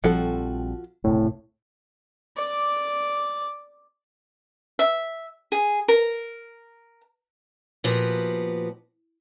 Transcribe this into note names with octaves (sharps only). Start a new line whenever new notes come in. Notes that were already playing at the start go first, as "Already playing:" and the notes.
A#1 F3 G3 C4 F#4 A4
E1 C#2 A2 C3
D5 D6
E5
G#4
A#4
A#2 F3 B3 F#4 G4